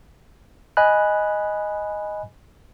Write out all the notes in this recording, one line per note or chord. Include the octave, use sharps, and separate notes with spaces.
D#5 G#5 B5 F#6